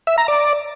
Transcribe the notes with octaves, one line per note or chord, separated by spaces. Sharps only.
E5
A#5
D5